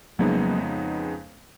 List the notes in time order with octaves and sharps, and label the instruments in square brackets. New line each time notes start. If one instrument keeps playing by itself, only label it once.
[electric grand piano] F2 C#3 G#3 B3 D#4 [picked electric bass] F#3 A#3